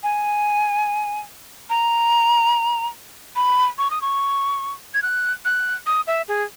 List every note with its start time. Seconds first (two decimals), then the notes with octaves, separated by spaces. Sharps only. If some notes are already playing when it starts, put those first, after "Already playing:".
0.03 G#5
1.70 A#5
3.36 B5
3.78 C#6
3.91 D#6
4.02 C#6
4.94 G#6
5.02 F#6
5.45 F#6
5.86 D#6
6.07 E5
6.28 G#4